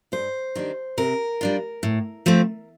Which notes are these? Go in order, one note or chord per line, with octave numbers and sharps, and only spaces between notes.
G2 C5
D#3 G3 D4
C3 A#4
G3 D4 F4
A2
F3 A3 C4